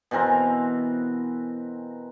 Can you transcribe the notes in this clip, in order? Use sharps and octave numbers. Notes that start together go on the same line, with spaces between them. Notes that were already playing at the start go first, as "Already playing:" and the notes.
B2 E3 C4 A#4